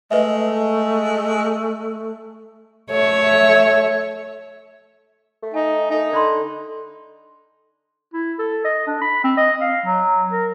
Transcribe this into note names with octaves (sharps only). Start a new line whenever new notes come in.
G#3 A3 B4 D#5 E5
A3 C#5 E5
A3
D#4 G#5
D#4 A4 G#5
D3 D5 B5 C6
E4
A4
D#5
D4
B5
C4
D#5
F5
F#3
A#4